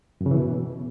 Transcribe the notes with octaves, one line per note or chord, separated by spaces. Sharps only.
F#2
C#3
E3
B2